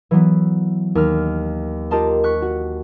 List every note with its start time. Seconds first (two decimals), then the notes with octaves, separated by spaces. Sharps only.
0.11 E3 F#3 B3
0.95 D#2 F6
1.91 F4 G4 A#4 D#5 A5 C6
2.24 C#6 F#6 B6
2.42 F#4